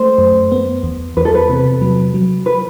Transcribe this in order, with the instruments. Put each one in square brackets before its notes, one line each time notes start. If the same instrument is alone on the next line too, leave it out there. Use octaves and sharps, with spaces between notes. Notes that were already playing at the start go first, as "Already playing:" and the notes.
Already playing: [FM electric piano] A3 [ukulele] C5
[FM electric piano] F#2
B3
E2
[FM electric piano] E2 [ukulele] B4
[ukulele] A4
B4
[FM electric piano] C3
F#3
F#3
[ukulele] B4